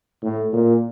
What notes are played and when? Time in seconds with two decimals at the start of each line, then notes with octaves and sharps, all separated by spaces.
0.22 A2
0.53 A#2